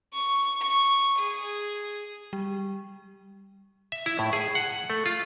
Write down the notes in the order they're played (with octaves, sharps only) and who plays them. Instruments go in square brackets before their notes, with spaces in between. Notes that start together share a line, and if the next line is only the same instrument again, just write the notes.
[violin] C#6
C#6
G#4
[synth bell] G3
[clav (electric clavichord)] E5
E4
A2
G#4
F#5
A3
F4